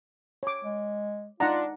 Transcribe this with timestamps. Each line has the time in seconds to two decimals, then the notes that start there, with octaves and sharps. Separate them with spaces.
0.43 C#5 D6
0.64 G#3
1.40 D4 D#4 F4 F#5 A#5